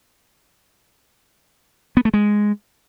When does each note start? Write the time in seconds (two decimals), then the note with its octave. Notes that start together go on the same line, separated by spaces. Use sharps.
1.97 B3
2.05 A3
2.14 G#3